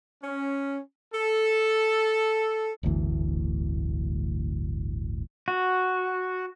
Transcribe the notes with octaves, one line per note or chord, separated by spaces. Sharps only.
C#4
A4
D1 G1 D2 E3
F#4